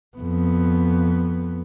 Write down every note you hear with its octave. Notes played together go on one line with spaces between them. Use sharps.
F2 B3